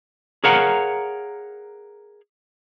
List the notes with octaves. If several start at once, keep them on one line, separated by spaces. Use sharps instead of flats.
G#4 A#4 C#5 F5 F#5 A#5